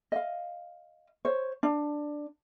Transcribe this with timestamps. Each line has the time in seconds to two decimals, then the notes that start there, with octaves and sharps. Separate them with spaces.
0.12 D#5 F5
1.25 C5 C#5
1.63 D4